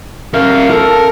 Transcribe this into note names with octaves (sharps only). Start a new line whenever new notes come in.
A#4 E5 F5
A4 A#4